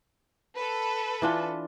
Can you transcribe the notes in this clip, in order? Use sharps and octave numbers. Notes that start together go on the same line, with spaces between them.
A4 B4
E3 D4 F4